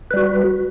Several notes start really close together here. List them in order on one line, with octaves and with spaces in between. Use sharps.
B4 G3 F#4